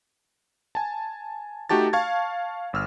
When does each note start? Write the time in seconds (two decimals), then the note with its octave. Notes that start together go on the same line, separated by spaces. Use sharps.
0.75 G#5 A5
1.69 A3 D#4 F#4 G4 A5 A6
1.93 F5 A5 C#6 G#6
2.73 G1 E6 F6